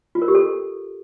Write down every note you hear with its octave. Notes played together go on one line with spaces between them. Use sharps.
F4
A#4
G4
A4